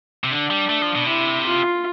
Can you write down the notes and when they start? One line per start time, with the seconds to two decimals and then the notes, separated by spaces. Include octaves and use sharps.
0.24 C3
0.32 D3 D4
0.51 G3
0.70 A3
0.82 F3
0.95 B2
1.07 C3 E4
1.46 F4